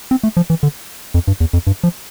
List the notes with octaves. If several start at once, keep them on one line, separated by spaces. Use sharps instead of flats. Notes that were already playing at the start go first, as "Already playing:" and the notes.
C4
A3
F3
E3
D3
F2
G2
E2
F2
G2
F3